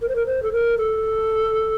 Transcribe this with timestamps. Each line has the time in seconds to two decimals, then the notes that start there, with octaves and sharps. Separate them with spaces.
0.01 A#4
0.09 C5
0.16 A#4
0.26 C5
0.43 A4
0.52 A#4
0.78 A4